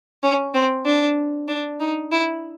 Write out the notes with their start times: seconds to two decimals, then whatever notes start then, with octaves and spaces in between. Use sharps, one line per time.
0.23 C#4
0.54 C4
0.86 D4
1.48 D4
1.80 D#4
2.12 E4